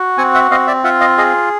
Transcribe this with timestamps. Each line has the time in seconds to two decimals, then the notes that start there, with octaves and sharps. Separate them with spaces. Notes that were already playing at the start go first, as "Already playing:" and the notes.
Already playing: F#4
0.18 C4 F#5 G#5
0.34 E5 F#5
0.51 C4 D#5 F5
0.67 D5 E5
0.84 F4 E5 F#5
1.00 D#5 F5
1.17 G#4 D#5 F5